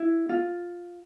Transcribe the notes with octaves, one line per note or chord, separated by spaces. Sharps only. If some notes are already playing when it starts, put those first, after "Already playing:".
Already playing: E4
F4